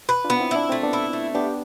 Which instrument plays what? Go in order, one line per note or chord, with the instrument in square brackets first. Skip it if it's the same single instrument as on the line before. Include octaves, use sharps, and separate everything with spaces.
[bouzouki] B4
[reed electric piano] D4 F4
[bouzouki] B3
[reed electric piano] C4 E4
[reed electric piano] D4 [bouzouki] E4
[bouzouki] A3 [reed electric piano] C4
[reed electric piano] B3 D4
[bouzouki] E4
A3
[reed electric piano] B3 D4 [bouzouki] G4